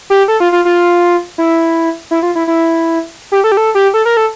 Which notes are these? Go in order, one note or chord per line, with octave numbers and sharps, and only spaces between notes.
G4
A4
F4
F4
F4
E4
E4
F4
E4
E4
G4
A4
G4
A4
G4
A4
A#4
A4